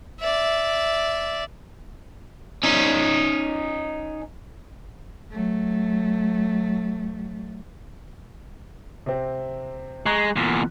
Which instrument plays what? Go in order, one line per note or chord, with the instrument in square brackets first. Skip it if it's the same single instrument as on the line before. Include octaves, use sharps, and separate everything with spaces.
[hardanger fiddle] D5 E5
[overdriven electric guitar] C#4 D#4
[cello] F#3 A3
[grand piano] C3 C4
[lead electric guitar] G#3 [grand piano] A#5 C#6 F#6
[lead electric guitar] E2 A#2